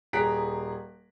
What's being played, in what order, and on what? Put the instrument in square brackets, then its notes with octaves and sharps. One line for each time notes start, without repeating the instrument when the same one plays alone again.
[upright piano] D#1 G#4 A#5 F#6 B6 D7